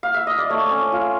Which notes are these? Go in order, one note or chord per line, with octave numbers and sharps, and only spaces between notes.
F5
E5
D#5
D5
A3 C#5
C#4
F4